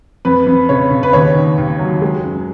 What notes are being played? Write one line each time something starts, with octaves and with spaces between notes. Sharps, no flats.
F2 B4
F2
C#3 C#5
C#3
B4
D#2 C#5
D#3
D#2
F#3
G#3
F#2